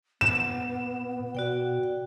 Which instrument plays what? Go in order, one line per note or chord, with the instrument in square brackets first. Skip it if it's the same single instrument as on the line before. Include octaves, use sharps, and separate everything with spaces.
[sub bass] A#2 [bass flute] B3 [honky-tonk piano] E7
[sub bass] B2 [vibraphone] F#4 D5 G5